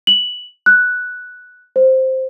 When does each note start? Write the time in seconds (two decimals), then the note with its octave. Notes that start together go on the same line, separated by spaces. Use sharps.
0.07 F#7
0.66 F#6
1.76 C5